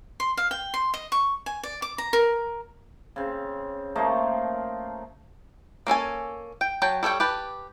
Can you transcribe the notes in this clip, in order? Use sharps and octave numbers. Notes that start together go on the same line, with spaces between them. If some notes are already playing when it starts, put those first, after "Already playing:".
C6
F5
G5
C6
D#5
C#6
G#5
D5
D6
A#5
A#4
C#3 C4
F3 A3 A#3 D#4
A#3 C#4 A4 G#5
G5
F#3 G5 A5
G3 A4 C#5 G5
G4 B4 A5